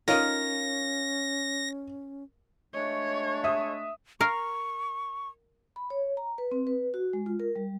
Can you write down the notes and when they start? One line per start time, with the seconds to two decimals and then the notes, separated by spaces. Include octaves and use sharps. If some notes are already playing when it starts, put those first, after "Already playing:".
0.08 C#4 D#4 F4 A#4 C#5 D#5 A#6
2.74 G#3 A3 D4 C#5
3.44 E5 D#6
4.21 A#4 F5 C#6
5.76 B5
5.90 C#5
6.17 A#5
6.38 B4
6.51 C4
6.67 B4
6.94 F#4
7.13 G#3
7.26 F4
7.40 A#4
7.56 G3